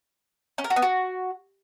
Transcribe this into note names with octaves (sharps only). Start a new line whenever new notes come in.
C#4
A#4
F#4
B3
F#4